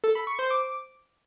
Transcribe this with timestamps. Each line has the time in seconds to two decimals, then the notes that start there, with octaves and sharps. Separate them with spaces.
0.04 A4
0.15 B5
0.27 C#6
0.39 C5
0.50 D6